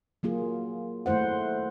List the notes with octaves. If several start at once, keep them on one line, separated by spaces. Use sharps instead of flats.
F#3 A#3 F4 G#4
D#3 A3 E4 C5 F#5